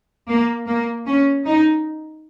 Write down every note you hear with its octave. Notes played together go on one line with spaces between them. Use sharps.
A#3
A#3
C#4
D#4